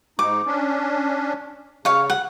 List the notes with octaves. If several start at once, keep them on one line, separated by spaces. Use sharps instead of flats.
G#2 D#4 D6
C#4 D4
C#3 C#5 F5
F#5